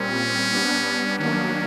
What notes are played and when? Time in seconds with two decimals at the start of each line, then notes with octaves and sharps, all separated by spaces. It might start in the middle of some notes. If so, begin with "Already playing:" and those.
Already playing: A#2 G3 C4 C#4
0.52 G3 B3 D4
1.18 D#3 F#3 A#3 C#4 D4